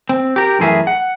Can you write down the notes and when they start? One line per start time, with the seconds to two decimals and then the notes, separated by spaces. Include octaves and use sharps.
0.09 C4
0.36 G4 A#4
0.59 F#2 E3 A3 G#4 A#4 E5
0.87 F#5